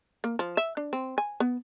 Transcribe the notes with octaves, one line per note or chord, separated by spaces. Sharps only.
A#3
F3
E5
D4
C4
G#5
B3